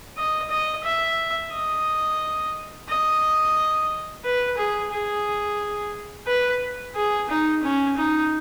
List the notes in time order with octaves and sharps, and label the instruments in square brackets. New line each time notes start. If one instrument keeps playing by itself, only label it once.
[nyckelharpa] D#5
D#5
E5
D#5
D#5
B4
G#4
G#4
B4
G#4
D#4
C#4
D#4